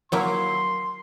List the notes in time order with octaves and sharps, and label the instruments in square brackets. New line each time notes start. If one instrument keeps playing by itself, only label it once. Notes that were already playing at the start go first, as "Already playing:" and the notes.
[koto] F#3 A#3 E4 [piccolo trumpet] C6